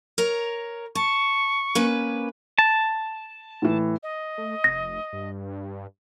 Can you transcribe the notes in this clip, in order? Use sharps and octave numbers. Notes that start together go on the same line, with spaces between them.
A#4 C#5 A#5
A5 C#6
A#3 C#4 B4
A5
A2 E3
D#5
A3
F1 A#6
G2